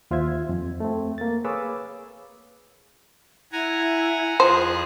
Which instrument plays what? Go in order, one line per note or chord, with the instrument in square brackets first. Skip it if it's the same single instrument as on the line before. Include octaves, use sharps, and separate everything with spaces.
[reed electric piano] D#2 F4 C5 E5 G#6
F2
A3 C4
A#3 A6
G#4 B4 C#5 F5 D6 E6
[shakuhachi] E4 [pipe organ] F#5 G#5 A#5
[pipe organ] F2 G#4 F#6 [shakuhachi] F4 [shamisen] C5